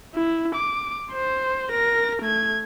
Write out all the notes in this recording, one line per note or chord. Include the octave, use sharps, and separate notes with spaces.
E4
D6
C5
A#4 A#6
A3 G#6